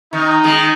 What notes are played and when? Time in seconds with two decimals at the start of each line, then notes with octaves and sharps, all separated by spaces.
0.13 D#3 D#4
0.44 D#3 G#3